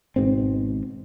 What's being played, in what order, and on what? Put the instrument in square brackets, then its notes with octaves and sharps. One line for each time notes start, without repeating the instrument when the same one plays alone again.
[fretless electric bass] G#1 G#2 B2 C4